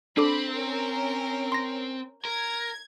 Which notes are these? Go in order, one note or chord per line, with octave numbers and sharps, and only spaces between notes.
C4 D4 A4 B5 D6
C#4 A#4
C6 A#6
A#4 G#6